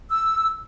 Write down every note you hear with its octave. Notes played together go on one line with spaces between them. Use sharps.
E6